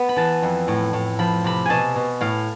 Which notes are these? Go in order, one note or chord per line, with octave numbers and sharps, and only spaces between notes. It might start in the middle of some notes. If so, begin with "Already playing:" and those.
Already playing: B3
B5
E3 A5
F2
A2
A2
F3 B5
C3 B5
B2 G#5 A5
B2
A2 F5